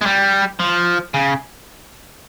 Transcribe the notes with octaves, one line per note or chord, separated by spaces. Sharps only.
G#3
G3
F3
C#3